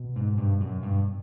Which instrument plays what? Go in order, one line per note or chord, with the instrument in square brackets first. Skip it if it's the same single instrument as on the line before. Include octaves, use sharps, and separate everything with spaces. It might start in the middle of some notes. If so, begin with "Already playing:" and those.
Already playing: [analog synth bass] B2
[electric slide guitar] G#2
G2
F#2
G2